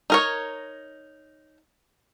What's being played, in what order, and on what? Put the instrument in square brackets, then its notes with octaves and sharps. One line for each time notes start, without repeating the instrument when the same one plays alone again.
[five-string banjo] D#4 A#4 C#5